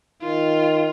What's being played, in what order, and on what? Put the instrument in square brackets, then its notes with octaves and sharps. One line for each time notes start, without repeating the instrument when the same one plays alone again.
[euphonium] D#3 [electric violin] F4